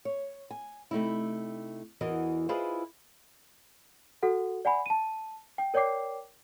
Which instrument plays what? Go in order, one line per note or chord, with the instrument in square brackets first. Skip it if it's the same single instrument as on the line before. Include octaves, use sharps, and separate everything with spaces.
[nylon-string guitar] C#5
G#5
C3 A3 D#4 E4
E2 E3 F#4 A#4 D#5
E4 F4 G#4 B4 C5 D#5
[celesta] F#4 A4 F#5
D5 F#5 G#5 B5
A5 D#7
G5
A#4 C#5 D5 G5 D6 C7